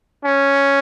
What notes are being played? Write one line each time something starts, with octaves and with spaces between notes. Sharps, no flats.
C#4